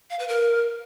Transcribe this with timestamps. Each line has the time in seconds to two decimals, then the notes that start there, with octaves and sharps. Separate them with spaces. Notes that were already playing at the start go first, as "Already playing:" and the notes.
0.10 F5
0.19 B4
0.28 A#4